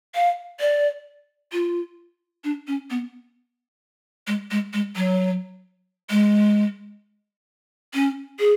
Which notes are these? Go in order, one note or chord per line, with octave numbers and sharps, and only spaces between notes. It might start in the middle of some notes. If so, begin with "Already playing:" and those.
F5
D5
F4
D4
C#4
B3
G#3
G#3
G#3
F#3
G#3
C#4
G#4